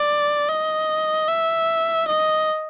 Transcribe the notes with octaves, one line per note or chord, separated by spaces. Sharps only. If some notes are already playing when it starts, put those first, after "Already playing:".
Already playing: D5
D#5
E5
D#5